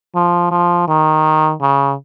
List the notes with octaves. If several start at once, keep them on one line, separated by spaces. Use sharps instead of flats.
F3
F3
D#3
C#3